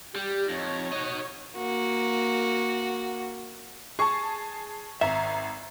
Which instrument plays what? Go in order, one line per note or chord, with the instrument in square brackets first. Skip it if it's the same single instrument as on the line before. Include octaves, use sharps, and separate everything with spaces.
[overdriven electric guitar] G3 [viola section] G4
[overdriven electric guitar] F2 [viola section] D#4 C#5
[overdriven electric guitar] F#4 D#5
[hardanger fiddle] A#3 F#4
[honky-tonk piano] G#4 A5 [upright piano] C#6
[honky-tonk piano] G#1 A#5 [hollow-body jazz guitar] E5